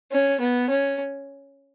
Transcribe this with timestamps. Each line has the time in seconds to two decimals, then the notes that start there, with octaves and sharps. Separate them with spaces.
0.12 C#4
0.40 B3
0.69 C#4